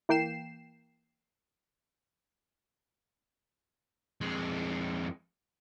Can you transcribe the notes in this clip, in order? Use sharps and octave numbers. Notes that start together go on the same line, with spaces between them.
E3 A#3 G5 C7 E7
F2 G#3